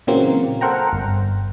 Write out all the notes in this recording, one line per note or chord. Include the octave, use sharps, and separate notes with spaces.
A#2 C#3 E3 F#3 A#3 C4
A4 A#4 C5 F#5 G5 A#5
G1